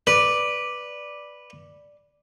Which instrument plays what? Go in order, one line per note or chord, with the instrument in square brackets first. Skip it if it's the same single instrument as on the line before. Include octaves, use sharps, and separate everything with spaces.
[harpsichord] B4 [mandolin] D5